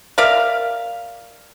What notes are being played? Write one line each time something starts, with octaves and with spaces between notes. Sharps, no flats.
A#4 D5 E5 F5